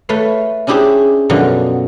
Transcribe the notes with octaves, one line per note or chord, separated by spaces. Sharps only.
A3 B4 C#5 F5
C#4 D4 E4 G4 G#4 C5
F#2 B2 D3 F3 F#3